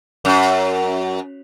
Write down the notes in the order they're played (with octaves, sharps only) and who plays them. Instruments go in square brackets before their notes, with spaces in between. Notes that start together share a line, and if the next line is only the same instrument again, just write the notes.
[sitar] F#2